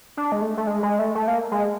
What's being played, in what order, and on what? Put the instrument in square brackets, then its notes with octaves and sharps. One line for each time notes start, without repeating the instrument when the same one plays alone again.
[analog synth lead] D4
G#3
A3
A3
G#3
G#3
A3
A3
A#3
G#3